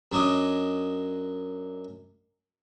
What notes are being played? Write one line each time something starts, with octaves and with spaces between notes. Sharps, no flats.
F#2 F#3 D4 D#5